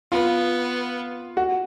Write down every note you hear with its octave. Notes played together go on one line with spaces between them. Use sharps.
B3 F4
F#4